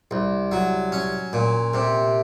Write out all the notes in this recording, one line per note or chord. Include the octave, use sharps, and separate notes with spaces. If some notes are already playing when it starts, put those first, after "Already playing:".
C2
F#3
C#4
A#2
C3